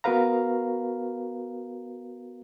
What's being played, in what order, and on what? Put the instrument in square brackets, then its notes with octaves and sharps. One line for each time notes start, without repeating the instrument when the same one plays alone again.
[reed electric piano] B3 F#4 A#4 B4 F5 A#5